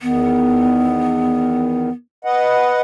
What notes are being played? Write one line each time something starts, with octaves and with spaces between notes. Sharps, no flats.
E2 D#3 B3
B4 D#5 F#5